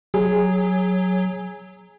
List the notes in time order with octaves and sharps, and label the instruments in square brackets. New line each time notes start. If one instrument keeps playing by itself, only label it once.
[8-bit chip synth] F#3 [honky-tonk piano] G#4